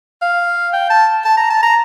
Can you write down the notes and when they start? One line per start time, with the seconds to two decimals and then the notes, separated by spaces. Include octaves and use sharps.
0.22 F5
0.73 G5
0.90 A5
1.25 A5
1.38 A#5
1.50 A5
1.63 A#5